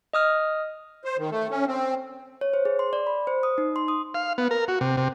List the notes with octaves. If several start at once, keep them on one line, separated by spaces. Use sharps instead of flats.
D#5 D#6 F6
C5
D#3
A3
C#4
C4
C#5
C5
G#4
C6
D5
B5
C5
D#6
D#4
C6
D#6
F5
B3
A#4
F#4
C3
C3